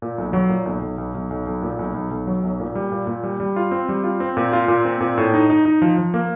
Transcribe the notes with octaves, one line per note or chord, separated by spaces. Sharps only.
A#2
B1
F#3
A#2
B1
B1
B1
B1
B1
B1
A#2
B1
B1
B1
F#3
B1
A#2
G3
A#2
A#2
G3
G3
F4
C4
G3
F4
C4
A#2
F4
A#2
C4
A#2
A2
D#4
D#4
D#4
F3
F3
A#3